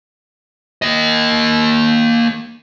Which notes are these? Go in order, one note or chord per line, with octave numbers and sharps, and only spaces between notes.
A#3 D#5